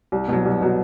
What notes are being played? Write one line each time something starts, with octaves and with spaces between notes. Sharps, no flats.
C2
B2 F#3
C2
B2 F#3